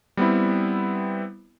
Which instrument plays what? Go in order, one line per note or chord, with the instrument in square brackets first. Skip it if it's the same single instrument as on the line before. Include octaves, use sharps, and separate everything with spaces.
[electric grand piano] G3 B3 C4 E4